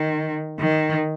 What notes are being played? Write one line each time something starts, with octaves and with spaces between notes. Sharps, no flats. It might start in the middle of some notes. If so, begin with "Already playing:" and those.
Already playing: D#3
D#3